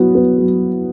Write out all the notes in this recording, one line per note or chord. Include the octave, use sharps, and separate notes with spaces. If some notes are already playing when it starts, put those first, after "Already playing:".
Already playing: F#3 B3 E4
B3
F#3